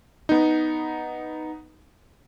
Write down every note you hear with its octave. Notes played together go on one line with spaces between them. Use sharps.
B3 D#4